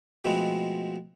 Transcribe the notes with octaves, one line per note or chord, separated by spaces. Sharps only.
B2 F3 G#3 A3 B3 C4